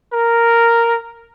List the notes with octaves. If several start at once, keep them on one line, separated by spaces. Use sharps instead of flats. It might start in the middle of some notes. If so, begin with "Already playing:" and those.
A#4